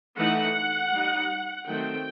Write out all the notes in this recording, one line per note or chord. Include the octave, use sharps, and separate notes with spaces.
E3 A3 D#4 F#5
G3 D#4
D#3 F#3 A3 C4 G5